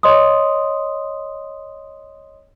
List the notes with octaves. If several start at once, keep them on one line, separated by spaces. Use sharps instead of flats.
C#5 D#5 C6 D#6